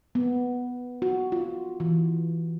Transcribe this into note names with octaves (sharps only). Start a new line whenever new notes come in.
B3
F#4
F4
E3